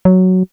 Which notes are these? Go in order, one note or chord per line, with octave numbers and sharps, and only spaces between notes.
F#3